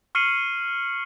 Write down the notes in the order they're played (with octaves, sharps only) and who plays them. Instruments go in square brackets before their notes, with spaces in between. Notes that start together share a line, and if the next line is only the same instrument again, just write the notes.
[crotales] C#6 F6 C7 C#7 D#7 F#7